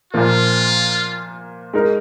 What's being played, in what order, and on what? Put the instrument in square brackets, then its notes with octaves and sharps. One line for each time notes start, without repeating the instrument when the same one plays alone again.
[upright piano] A#2 F3 A#3 [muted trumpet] F4
[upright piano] G#3 D#4 A#4